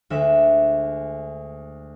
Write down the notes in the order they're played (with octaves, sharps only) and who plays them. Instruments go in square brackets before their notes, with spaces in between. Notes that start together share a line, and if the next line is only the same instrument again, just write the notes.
[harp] D2 G#3 E5